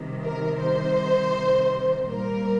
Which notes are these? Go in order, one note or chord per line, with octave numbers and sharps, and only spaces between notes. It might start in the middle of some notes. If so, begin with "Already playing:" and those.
Already playing: C2 C3 D#3
A#4
C5
A#2 G3 A#3 A#4